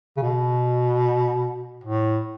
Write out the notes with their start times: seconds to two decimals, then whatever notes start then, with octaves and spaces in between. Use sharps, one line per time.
0.17 C#3
0.22 B2
1.84 A2